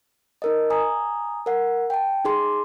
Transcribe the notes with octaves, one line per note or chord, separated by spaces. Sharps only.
D#4 A#4 D#5
G#5 A#5 D#6
A#4 F#5
G5 A5
D#4 G#4 C6